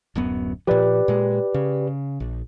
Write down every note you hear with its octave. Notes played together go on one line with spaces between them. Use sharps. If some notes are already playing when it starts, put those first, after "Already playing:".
D1 F#2 B3
A#2 F3 G4 B4 D5
A#2 G#3
C#3
A#1